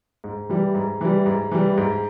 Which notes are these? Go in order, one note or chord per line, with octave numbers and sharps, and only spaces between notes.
G#2
E3 G3
G#2
E3 G3
G#2
E3 G3
G#2